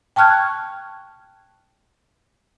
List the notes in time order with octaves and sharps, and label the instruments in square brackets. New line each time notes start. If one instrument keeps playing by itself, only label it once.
[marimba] G5 A5 C#6 F6 F#6 G#6